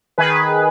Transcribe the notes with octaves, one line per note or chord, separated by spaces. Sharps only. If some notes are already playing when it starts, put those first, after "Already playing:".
D#3 G#4 B4